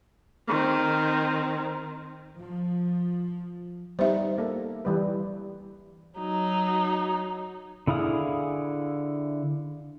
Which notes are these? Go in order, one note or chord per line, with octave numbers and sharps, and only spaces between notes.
D#3 C4
F3
G3 B3 D#4 C5 E5
A#3 A4
E3 G3 B4
F#3 D#4
D3 E4 G#4 F5 D#6